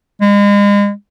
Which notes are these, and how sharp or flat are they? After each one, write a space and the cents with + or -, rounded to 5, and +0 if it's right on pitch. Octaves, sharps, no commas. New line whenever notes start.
G#3 -35